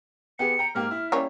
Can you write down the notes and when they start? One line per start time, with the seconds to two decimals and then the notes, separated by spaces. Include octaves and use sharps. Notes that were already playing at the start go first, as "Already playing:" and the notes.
0.39 B3 G4 G#4 C#7
0.59 G5 A#5
0.75 G#2 A#3 G4 F6
0.91 E4
1.12 G3 A#3 C#4